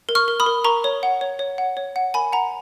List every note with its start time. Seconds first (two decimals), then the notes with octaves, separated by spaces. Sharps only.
0.09 A#4
0.15 C#6 F6
0.28 A#4
0.40 B5 D#6
0.46 A#4
0.65 A#4 A#5 C#6
0.84 C#5
1.03 F#5
1.21 C#5
1.39 C#5
1.58 F#5
1.77 C#5
1.96 F#5
2.14 A#4 G#5 B5
2.33 F#5 A#5